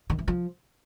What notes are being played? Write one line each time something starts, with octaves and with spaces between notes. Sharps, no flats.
D#3
E3
F3